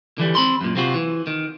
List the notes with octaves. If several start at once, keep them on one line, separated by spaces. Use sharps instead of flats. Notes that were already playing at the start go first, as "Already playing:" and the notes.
D3 E3 G3
C4 B5 C6
F#2 A#2
C3 C4 F4 F#4
E3
D#3